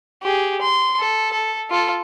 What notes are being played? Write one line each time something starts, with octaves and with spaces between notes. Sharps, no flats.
G4 G#4
C6
A4
A4
F4 A4